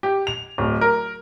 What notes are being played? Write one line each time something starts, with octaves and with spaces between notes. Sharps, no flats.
G4
F7
D1
A#4